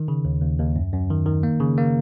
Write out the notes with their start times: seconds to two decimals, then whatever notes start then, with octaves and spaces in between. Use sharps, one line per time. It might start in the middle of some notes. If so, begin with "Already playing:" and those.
Already playing: D#3
0.08 C#3
0.25 D#2
0.42 D#2
0.59 D#2
0.76 F#2
0.93 F#2
1.10 D#3
1.26 D#3
1.43 A#3
1.60 C#3
1.78 A#3